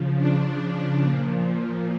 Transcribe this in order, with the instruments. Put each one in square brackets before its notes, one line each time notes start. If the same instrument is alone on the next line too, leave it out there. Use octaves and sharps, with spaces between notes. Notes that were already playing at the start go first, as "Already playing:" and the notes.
Already playing: [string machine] C#3 F3
D4
A#2 F3